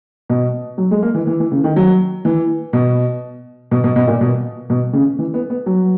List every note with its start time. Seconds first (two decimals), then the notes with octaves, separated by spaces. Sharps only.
0.30 B2
0.78 F#3
0.91 G#3
1.02 A#3
1.15 E3
1.27 E3
1.40 E3
1.52 C#3
1.64 D#3
1.76 F#3
2.25 E3
2.73 B2
3.71 B2
3.84 B2
3.96 B2
4.07 A#2
4.21 B2
4.70 B2
4.93 C#3
5.19 E3
5.34 B3
5.50 B3
5.66 F#3